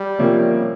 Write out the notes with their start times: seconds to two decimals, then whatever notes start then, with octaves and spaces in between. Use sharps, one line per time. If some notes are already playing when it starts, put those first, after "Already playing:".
Already playing: G3
0.19 C3 F3 A#3 C#4